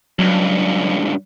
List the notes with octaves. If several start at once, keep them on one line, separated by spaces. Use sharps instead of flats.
C#2 G2 F#3